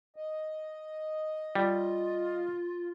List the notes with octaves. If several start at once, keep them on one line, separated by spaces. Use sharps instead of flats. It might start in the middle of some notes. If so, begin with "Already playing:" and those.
D#5
G3 F4